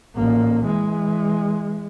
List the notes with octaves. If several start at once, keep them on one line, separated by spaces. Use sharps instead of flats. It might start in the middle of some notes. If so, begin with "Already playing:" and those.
A1 A#3
E3 G#3